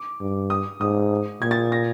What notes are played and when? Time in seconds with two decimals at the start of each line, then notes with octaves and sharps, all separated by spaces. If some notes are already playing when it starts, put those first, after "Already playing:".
Already playing: D6
0.20 G2
0.50 D#6
0.81 G#2 D#6
1.41 A#2 G#6
1.51 A6
1.72 A#6